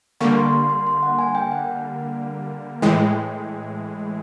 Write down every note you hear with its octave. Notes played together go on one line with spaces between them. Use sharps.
D3 G3 A#3 C#6
C6
C6
C6
C6
F#5
G#5
G5
F#5
A2 E3 G#3 G5